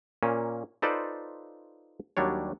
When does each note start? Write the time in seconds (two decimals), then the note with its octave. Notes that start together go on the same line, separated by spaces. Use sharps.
0.23 A#2 A#3 C#4
0.82 D#4 F4 A4 B4 C5 D5
2.17 D#2 F#3 G3 D4 C#5